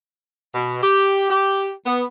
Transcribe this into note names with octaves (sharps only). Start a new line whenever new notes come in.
B2
G4
G4
B3